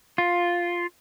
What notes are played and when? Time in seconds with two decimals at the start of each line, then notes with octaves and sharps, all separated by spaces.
0.18 F4